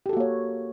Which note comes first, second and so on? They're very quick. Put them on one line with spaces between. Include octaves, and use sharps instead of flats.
G4 A4 F#4 A#3 C#5